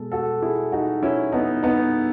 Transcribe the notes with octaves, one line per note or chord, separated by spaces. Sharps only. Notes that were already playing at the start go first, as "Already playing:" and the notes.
Already playing: B2 G#3 B3 A4
F#4 A4
E4 G#4
D#4 F#4
C#4 E4
B3 D#4
B3 D#4